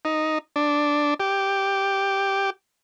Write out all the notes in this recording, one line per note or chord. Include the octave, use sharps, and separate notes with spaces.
D#4
D4
G4